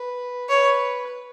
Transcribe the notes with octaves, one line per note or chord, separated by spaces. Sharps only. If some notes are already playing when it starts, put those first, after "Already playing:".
Already playing: B4
B4 C#5